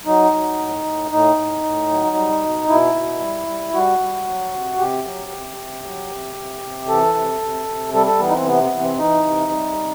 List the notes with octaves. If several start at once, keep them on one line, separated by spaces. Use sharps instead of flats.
F#3 D#4
F#3
A2
A2
A2 D#4
A2
A2
F#3
G3
B2
B2 E4
B2
G3
G3
G3 F#4
G3
F#3
C3
C3 G4
F#3
C3
C3
F#3
C3
C3
C3
E3 A4
C3
C3
C3
G3 A4
A4
E3 B3
D#4
C4
C3 B3
B3
E3
C4
E3 D#4
C3
G3
C3